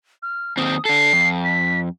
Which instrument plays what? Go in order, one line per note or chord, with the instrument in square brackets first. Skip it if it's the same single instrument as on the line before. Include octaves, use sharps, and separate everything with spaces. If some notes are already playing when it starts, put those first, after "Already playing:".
[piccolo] F6
[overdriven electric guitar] D#2 C4 [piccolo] D#6
[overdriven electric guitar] D4 A4 [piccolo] C7
[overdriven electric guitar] F2
[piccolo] B6